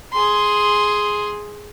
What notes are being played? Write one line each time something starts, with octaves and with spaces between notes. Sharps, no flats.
G#4 C6